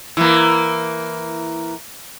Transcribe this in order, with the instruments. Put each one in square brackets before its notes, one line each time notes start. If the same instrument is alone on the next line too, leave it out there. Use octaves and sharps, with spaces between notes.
[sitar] E3 A#3